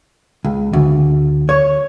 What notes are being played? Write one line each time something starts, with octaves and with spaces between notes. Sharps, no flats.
C#2
D2
C#5